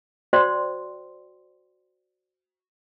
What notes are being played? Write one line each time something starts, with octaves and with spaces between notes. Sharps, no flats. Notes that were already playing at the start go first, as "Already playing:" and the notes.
F#4 C5 D5 G5 C6